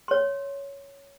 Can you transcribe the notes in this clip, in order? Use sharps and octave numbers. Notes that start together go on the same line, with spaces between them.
C#5 C6